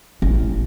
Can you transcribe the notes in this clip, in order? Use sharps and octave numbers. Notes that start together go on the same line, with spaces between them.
A1